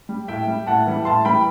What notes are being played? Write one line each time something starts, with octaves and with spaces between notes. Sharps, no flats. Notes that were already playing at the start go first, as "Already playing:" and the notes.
G3
A2 E5 G5
G3
A2 F#5 A5
E3 G3
A2 A5 C6
E3 G3 G5 B5